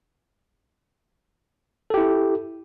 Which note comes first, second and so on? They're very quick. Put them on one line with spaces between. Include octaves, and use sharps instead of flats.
A4 G4 E4